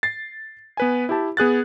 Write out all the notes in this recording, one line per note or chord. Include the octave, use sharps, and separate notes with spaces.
A6 C7
B3 B4 G#5
E4 G4 A5
B3 G#4 F#6 A6